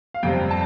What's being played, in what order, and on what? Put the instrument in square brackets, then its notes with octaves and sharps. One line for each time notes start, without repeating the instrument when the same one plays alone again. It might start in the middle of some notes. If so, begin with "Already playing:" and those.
[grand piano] F5
F2 C3 G3 C4 G5
A5